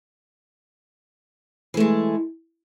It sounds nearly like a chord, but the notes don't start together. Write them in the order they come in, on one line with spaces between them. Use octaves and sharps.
E3 A3 G#3